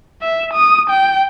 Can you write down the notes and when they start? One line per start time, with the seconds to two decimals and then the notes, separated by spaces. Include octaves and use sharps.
0.22 E5
0.53 D#6
0.90 G5